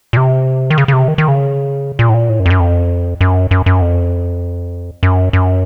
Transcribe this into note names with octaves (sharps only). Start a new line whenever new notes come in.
A#2
C3
D#3
C#3
C#3
C3
D#3
D#3
C#3
A#2
A2
A#2
A2
F#2
F2
F#2
F2
F#2
F#2
F#2
F2
F#2
F#2